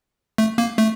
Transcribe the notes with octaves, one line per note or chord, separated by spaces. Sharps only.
A3
A#3
A3